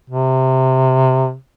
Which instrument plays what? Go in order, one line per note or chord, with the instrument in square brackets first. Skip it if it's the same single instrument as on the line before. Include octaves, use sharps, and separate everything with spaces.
[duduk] C3